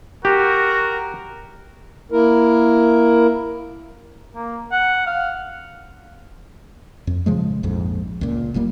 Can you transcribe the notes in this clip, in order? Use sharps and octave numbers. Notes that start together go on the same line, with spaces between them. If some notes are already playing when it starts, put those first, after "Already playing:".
F#4 G4 A#4
A#3 E4 A#4
A#3
F#5
F5
F2
A#2 C#3 F3 G#3
A#1 F2 G#2
C#2 A#2
F1 A#2 G3 A#3